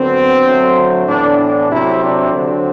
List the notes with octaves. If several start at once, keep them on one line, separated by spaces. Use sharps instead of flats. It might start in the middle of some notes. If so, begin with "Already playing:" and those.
Already playing: D3 F#3 B3 C4
D3 F#3 A3
A2 E3 B3 D4
D4
C3 F#3 A3 C4 E4
D4
D3 F#3 C4